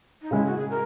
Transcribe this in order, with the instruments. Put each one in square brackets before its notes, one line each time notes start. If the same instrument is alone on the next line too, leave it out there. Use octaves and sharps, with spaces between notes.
[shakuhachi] D#4
[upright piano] C#3 G#3 [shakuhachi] E4
[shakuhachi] F#4
G#4
A#4